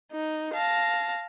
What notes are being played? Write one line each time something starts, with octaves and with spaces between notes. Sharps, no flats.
D#4
F5 A5 A#6